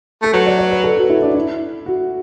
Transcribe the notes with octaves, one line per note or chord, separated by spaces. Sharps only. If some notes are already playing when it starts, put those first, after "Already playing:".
A3 A4
F#3 B4
D5
D5
B4
A4
F#4
E4
D4
E4
F#4